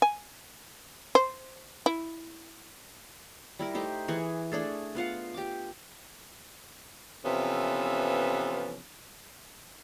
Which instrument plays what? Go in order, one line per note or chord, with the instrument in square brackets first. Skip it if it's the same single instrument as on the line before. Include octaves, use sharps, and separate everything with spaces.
[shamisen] G#5
C5
E4
[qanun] G3 E4 A#4
A3 D#4 G4 C5
E3 G#4 C#6
A3 D4 G#4 A4
B3 F4 F5 F#5
G4 D6
[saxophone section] C3 E3 F3 B3 C#4 A4